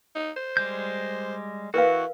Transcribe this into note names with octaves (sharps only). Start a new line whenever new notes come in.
D#4
C5
G3 G#3 G6
E3 F#4 A#4 B4 F5